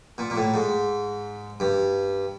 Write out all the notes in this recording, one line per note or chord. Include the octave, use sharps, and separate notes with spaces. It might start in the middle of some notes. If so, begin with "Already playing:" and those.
A#2
A#2
A2
G#2
G2